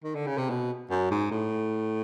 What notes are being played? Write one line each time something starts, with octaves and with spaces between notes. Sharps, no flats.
D#3
D3
C#3
C3
B2
F#2
G#2
A2